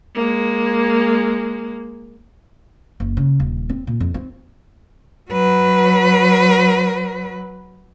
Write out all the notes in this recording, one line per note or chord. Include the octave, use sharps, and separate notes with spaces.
G#3 A#3
F#1
C#3
D#1
C4
A#2
F2
C4
F#3 B4